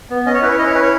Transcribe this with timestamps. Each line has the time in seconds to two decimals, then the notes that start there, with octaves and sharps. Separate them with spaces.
0.10 B3
0.26 C#4 D#5
0.35 C#5
0.42 E4 B4
0.50 C#5
0.58 E4 D#5
0.67 C#5
0.75 C#4 B4
0.82 C#5